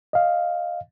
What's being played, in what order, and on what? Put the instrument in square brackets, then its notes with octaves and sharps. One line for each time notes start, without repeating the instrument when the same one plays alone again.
[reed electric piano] D#5 F5